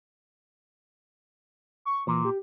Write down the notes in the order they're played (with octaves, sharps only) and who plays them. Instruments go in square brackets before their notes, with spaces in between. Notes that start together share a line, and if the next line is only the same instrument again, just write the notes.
[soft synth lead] C#6
[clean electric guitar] A#2 [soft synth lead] E3
[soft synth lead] G4